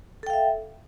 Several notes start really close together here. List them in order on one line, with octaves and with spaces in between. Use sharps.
A4 G5 F5 E5